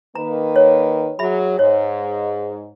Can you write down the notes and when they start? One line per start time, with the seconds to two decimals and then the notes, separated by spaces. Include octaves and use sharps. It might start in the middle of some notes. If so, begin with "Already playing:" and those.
0.15 D#3 A#3 B4 A#5
0.56 C#5
1.19 F#3 G#4 E5 B5
1.59 G#2 C#5